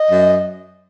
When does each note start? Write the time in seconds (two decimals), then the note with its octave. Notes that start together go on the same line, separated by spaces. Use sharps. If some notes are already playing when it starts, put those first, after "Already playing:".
Already playing: D#5
0.10 F#2